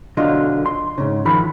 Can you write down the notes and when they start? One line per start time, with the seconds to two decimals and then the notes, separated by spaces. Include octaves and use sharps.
0.17 B1 D3 F#3 F4 D#5 C6
0.66 C6
0.98 G#2 C#3
1.25 D#3 F3 B5